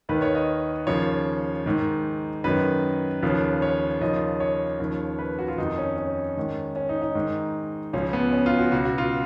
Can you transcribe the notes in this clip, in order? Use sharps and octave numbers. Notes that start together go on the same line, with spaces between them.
D#2 D#3 B4
C#5
D#5
D#2 C#3 F3 C#5
G#2 D#3
F#2 D#3 B4
D#2 C#3 F3
C#5
D#2 C#3 F3 D#5
C#5
D#2 C#3 F3
B4
F#4
F4
F2 D#3 D#4
C#4
C#4
G#2 D#3
C#4
D#4
D#4
G#2 D#3
C#2 C#3 F3 C#4
B3
C#4
F4
F#4
C#2 B2 F#4
F#4
F4